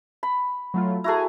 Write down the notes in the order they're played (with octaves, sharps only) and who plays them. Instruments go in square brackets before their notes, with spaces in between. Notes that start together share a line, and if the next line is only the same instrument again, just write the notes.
[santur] B5
[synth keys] F#3 A3 F4
[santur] E4 F#4 A4 [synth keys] G#4 A#5